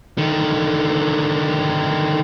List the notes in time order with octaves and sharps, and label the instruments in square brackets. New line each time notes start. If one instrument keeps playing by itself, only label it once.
[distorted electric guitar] D3 D#3